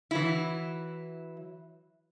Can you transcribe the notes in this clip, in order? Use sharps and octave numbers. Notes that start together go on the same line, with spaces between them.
E3 F#3 E4